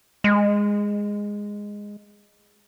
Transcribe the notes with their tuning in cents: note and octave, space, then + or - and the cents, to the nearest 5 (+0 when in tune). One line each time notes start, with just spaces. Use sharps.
G#3 -10